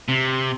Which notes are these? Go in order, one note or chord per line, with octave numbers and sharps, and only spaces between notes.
C3